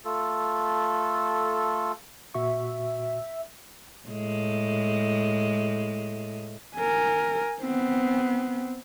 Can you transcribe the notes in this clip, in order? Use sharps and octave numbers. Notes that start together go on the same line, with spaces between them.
A3 F4 A4
A#2 F#4 E5 C#6
A2 G#3
A#4 G#5
B3 C4